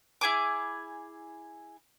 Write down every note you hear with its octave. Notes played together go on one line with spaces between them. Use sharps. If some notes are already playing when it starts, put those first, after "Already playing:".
E4 G#4 G#5 D6